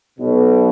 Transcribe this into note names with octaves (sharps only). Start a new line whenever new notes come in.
B1 B2